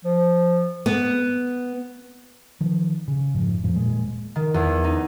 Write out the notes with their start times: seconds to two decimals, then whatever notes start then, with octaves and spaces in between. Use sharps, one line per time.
0.05 F3
0.86 B3
2.61 D#3 F3
3.08 C#3
3.34 F1 G#2 F3
3.63 F2 A2 F3 F#3
3.76 D#1 A#2 G#3
4.36 D#3
4.54 E2
4.84 D#4